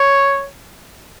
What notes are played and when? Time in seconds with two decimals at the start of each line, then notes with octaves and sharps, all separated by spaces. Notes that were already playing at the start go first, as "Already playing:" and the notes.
Already playing: C#5